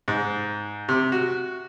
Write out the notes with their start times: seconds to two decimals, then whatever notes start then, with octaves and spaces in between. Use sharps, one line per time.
0.08 G#2
0.89 C3
1.12 F#4